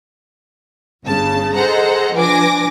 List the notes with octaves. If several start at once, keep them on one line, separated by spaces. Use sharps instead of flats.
G1 G2 C#3 A5
G#4 A4 C5 D#5 F#5 A#5
F3 D4 B4 G#5 D6 A#6